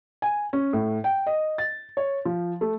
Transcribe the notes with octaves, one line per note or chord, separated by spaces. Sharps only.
G#5
C#4
A2
G5
D#5
A6
C#5
F3
A3